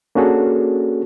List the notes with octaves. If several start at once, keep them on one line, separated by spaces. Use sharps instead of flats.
A#3 C#4 D4 F#4 G#4 A4